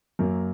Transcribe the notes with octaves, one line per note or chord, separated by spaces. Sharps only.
F#2 F#3 A#3 A#4